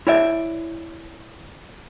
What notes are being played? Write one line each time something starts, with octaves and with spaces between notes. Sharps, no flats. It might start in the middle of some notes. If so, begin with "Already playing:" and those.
E4 C#5 D5 E5